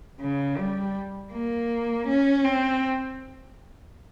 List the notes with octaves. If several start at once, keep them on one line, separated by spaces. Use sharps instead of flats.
C#3
G3
A#3
C#4
C4